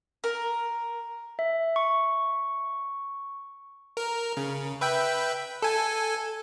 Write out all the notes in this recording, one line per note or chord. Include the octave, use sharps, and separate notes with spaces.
A#4
E5
C#6
A#4
C#3
B4 E5 G5
A4 G#5